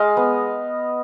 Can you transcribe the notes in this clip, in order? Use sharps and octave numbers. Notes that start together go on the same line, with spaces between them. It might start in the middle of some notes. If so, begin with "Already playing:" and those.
Already playing: G#3 D#5 F5
B3